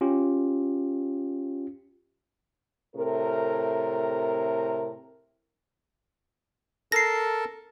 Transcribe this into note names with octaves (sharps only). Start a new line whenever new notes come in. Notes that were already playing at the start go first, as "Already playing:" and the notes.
C#4 F4 G4
A2 C3 A4 A#4
A4 A#4 A5 A#6 C7